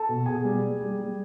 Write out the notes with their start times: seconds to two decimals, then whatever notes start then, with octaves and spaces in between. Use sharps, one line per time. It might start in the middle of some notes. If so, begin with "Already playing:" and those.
Already playing: A4 A5
0.09 B2
0.26 B2 G#4 G#5
0.45 G3
0.62 G3
0.81 G3
0.98 G3